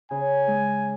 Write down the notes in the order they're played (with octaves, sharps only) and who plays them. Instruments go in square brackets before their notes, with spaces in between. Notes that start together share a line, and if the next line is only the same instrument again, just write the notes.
[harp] C#3 [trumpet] G#5
[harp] G#3